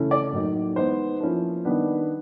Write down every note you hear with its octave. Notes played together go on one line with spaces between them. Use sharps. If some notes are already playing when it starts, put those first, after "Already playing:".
Already playing: C#3 E3 A3 C#4 E4
D5
A2 F#3 A#3 D#4
E3 G#3 B3 D#4 C5
F3 A#3 C#4 E4
D#3 G3 B3 D4